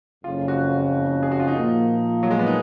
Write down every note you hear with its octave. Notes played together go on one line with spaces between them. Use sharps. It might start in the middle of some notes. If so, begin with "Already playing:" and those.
F#1 F2 C#3 F4
F#4
G#4
F#4
F4
D#4
A#2 F3 A#3
F#3
G#3
B3
D#4